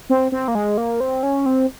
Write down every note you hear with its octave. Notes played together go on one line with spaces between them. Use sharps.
C4
C4
A#3
G#3
A#3
C4
C#4
C4